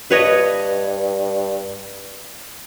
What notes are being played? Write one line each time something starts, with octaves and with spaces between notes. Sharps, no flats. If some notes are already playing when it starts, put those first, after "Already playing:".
G2 B4 C#5 D#5